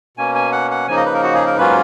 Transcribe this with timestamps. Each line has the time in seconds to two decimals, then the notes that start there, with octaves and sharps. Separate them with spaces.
0.17 B2 A#3 C#4 G#5
0.35 G#5
0.52 F#5
0.71 F#5
0.88 C#3 F3 A#3 D#4 G#5
0.97 D#5
1.06 B4
1.14 A#4
1.23 F#4
1.34 G#4
1.46 A#4
1.57 G#2 F#3 A#3 C#4 F4 B4